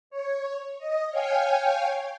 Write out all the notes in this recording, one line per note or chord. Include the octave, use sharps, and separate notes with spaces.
C#5
D#5
C#5 F5 G5 G#5